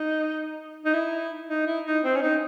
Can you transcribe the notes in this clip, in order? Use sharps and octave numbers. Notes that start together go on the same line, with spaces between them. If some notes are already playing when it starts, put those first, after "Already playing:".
Already playing: D#4
D#4
E4
D#4
E4
D#4
C4
C#4
D#4